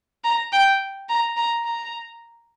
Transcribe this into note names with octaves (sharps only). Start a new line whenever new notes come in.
A#5
G5
A#5
A#5
A#5